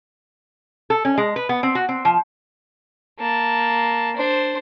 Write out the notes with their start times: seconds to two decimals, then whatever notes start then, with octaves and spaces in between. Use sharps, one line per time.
0.90 A4
1.05 C#4
1.18 G#3
1.36 B4
1.49 B3
1.63 C4
1.75 F#4
1.89 C4
2.05 F3
3.19 A#3 A5
4.17 D4 C5